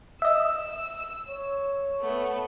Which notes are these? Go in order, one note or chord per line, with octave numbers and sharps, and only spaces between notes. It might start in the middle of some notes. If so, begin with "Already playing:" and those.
D#5 E5 E6
C#5
A3 B3